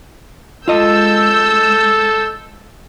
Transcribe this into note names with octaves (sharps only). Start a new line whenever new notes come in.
G#3 F4 A4 D#5 E6 G6